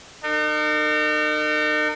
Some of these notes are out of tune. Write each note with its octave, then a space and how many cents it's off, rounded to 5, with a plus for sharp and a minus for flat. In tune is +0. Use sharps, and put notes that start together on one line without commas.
D#4 -40 A#4 -40